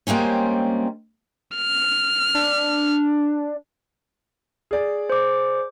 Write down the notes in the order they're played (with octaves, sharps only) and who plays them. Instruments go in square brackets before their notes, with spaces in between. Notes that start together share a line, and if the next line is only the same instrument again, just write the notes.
[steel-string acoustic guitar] G3 G#3 A#3 C4 C#4
[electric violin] F6
[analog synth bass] D4
[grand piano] G#4 D5
[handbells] C5 D6